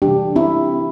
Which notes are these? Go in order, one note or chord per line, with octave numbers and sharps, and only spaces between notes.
C3 E3 G3 D4 G4
C4 E4